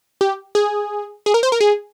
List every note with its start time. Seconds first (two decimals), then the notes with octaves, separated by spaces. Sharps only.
0.21 G4
0.55 G#4
1.26 G#4
1.34 A#4
1.43 C5
1.52 A#4
1.61 G#4